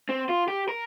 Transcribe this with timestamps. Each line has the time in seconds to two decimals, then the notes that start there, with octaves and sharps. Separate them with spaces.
0.09 C4
0.29 F4
0.48 G4
0.69 A#4